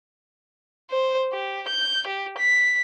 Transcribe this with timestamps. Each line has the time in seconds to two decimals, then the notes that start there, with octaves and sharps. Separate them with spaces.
0.91 C5
1.33 G4
1.68 G6
2.07 G4
2.38 B6